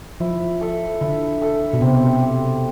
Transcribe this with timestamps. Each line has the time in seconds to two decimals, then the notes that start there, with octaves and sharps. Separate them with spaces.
0.20 F3 E4
0.61 A4 E5
1.01 D3 E4
1.42 A4 E5
1.73 B2
1.81 C3 C4
2.22 G4 C5 E5